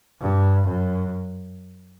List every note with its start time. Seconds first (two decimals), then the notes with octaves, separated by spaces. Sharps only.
0.21 G2
0.68 F#2